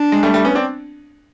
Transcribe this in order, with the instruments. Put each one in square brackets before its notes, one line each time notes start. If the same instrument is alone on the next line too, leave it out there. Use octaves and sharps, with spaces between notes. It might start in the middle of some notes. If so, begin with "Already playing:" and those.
Already playing: [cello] D4
[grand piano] G#3
G3 A3
G3 A3
B3 C#4
C4 D4